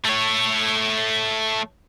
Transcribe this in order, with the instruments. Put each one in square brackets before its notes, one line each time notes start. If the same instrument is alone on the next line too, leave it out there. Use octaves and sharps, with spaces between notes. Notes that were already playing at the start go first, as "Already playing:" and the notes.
[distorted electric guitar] A3 C#5